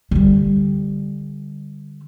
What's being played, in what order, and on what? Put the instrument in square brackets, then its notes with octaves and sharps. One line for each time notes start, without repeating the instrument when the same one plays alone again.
[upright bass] D3 G3